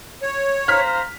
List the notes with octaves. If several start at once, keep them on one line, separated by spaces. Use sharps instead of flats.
C#5
C5 F5 A#5 F6 B6